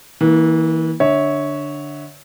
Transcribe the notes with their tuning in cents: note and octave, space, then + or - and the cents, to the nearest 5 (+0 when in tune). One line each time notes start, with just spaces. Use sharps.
E3 -30 A#3 +0
D3 +0 C#5 +0 E5 -25